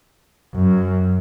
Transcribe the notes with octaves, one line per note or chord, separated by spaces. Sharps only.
F#2